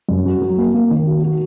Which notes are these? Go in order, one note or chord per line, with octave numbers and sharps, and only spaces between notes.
F#2
F#4
F#3
A#3
A#3
D#3
F#4
F#4